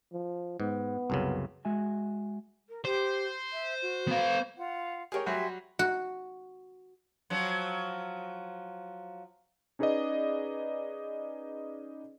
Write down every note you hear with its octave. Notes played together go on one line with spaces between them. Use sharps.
F3
G#2 B3
C2 F#2 C#3
G#3 F#4 E5 G#5
A#4
G4 C5
E5
F#4
B3 F5
F4 F#5
G4 G#4 A#4 C#5 G5
F#3 G3 F#4 E5 G#5 C6
F#4
F3 F#3
C#4 D#4 G#4 B4 D5 D#5